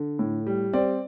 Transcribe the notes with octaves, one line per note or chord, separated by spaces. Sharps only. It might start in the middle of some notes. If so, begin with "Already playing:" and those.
Already playing: D3
A2
G3
C4 D5